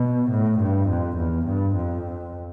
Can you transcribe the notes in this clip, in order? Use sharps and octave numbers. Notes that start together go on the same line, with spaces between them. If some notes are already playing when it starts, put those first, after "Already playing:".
Already playing: B2
A2
G2
F2
E2
G2
F2